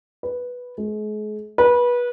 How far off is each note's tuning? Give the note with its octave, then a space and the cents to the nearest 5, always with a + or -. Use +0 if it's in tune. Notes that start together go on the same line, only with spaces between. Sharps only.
B4 -5
G#3 +40
B4 -25